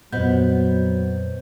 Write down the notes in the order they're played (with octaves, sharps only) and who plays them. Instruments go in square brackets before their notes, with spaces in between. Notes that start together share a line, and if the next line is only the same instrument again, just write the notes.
[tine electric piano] F2 A#2 [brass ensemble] F#3 [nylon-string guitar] B3 [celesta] C5 D#5 G6